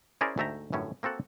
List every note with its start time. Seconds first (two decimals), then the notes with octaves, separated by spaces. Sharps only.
0.21 C#4 E4 G#4 A#4 C5 D5
0.38 D2 G#2 A3 E5 G5 A#5
0.72 G1 F#2 A2 C#4
1.03 A#3 C4 F#4 A4 F#5